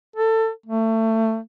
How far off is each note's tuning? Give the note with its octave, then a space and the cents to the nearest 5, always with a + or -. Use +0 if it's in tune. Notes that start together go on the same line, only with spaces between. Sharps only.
A4 +20
A3 +25